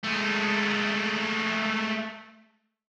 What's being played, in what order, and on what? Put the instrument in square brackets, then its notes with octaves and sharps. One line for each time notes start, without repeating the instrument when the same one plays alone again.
[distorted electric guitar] G#3 A3